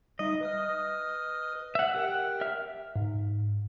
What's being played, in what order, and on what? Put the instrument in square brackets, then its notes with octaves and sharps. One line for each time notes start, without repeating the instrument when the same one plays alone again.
[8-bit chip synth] G3 D#4 E5 [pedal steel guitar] D#5
[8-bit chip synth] B4 D#6 F6
[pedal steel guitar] E5 F#5
[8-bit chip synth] G4 A#4 G5 [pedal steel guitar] F#5
[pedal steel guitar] E5 F6
[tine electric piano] G#2